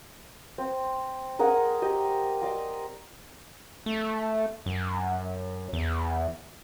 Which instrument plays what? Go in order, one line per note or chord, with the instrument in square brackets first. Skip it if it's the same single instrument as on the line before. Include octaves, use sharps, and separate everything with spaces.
[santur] C4
G#4 A#4 D#5 F#5
G4 D#5
D5 D#5 C6 D6
[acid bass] A3
F#2
E2